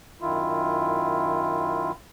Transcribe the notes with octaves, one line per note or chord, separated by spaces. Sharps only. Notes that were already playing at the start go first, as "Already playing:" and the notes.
F#2 D#3 E4 F4